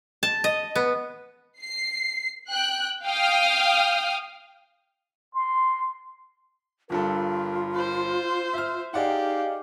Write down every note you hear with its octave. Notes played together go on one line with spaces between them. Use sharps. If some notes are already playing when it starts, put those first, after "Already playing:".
A5
D#5
B3
C7
G5 F#6
F5 G5 D#6 F6
C6
G1 G2 F4 A4 A#4
C5
E5 F6
D#4 G4 G#4 D5 F5 F#5